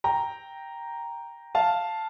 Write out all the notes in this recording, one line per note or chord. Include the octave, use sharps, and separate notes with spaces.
G5 A#5
F5 A5